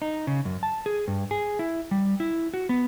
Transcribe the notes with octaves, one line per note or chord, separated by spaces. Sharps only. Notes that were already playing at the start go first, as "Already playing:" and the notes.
D#4
C#3
F#2
A5
G#4
G2
G#4
E4
G3
E4
F#4
B3